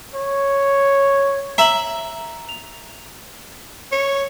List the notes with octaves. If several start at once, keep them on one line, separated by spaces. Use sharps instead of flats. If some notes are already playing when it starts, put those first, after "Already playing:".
C#5
E5 A#5 F#7
F7
C#5